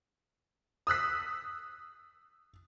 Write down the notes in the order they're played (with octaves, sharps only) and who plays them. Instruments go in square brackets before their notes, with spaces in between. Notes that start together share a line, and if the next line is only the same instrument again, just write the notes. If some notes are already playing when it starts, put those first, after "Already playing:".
[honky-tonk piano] D#6 E6 F#6 B6